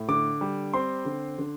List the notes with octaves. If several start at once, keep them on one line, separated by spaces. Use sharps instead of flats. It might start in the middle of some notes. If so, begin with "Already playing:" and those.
Already playing: A2
D3 D6
G3
C4 C6
D3
D3